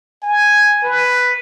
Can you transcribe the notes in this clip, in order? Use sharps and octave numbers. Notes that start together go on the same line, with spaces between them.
G#5
B4